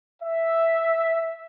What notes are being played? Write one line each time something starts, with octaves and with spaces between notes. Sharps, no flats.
E5